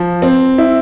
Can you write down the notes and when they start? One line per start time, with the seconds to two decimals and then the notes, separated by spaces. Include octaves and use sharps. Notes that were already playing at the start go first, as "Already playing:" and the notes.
Already playing: F3
0.22 C4
0.58 E4